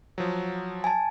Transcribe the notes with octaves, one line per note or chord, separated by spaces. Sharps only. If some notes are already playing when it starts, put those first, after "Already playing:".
F3 F#3
G#5 A5